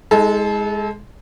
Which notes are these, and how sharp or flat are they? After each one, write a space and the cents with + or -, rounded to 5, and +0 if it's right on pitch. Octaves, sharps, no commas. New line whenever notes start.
G#3 +0 D#4 +45 A4 -30